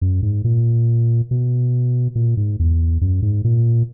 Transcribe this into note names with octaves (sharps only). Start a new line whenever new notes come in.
F#2
G#2
A#2
B2
A#2
G#2
E2
F#2
G#2
A#2